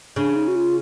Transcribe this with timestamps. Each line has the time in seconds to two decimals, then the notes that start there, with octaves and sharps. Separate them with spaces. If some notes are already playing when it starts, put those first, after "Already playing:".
0.16 C#3 D4
0.36 D#4
0.48 F#4
0.55 F4